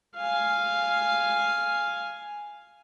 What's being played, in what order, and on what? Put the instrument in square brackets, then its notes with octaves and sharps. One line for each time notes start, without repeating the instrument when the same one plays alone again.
[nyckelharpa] F5 G#5